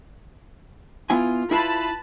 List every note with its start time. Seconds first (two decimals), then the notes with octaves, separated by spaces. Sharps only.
1.10 B3 E4 F4 G#5
1.51 E4 F4 B4 A5 B5